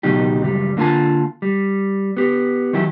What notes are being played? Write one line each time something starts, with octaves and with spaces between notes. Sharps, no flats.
C#2 B2 D#3 F#3 D#4 G4
C#2 F#2 G3
D3 A#3 B3 F4 G#5 A5
G3
B3 G4
D#3 E3 F#3 E4 G4